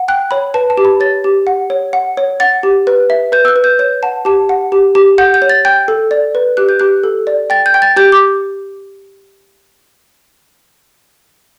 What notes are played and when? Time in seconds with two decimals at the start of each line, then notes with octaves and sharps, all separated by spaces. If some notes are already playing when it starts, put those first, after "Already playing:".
Already playing: F#5
0.08 G5 F#6
0.31 C#5 B5
0.54 B4 A5
0.70 A5
0.78 G4
0.85 B5
1.00 C#5 A6
1.24 G4
1.47 F#5
1.70 C#5
1.93 F#5
2.17 C#5
2.40 F#5 A6
2.63 G4
2.87 B4
3.10 E5
3.32 B4 G6
3.45 E6
3.48 F#6
3.56 B4
3.64 G6
3.79 C#5 G6
4.03 F#5 A5
4.25 G4 A5
4.49 F#5
4.72 G4
4.95 G4
5.18 F#5 G6
5.34 G6
5.42 C#5
5.50 A6
5.65 G5 G6
5.88 A4
6.11 D5
6.35 B4
6.57 G4 F#6
6.69 G6
6.80 G4 F#6
7.04 A4
7.27 D5
7.50 G5 A6
7.66 G6
7.74 G5
7.82 A6
7.97 G4 G6
8.12 D6